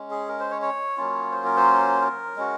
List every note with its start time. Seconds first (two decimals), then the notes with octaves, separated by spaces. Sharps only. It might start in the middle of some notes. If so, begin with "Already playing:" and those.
Already playing: G#3 C#4
0.11 G#4
0.28 A#4
0.40 C5
0.51 C#5
0.62 C#5
0.97 F#3 A#3 C#4 F4
1.31 C5
1.45 A#4
1.56 C5
2.01 A#4
2.37 G#3 C#4 F#4